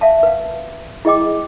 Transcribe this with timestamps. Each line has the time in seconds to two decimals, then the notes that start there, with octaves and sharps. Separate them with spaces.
0.01 E5 F5 A5
0.23 B4 F5
1.05 E4 G#4 D#5 G5 D6